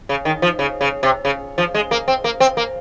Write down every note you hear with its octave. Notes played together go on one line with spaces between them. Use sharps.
C#3
D#3
F3
C#3
C#3
C3
C#3
F3
G#3
A#3
C4
A#3
C4
A#3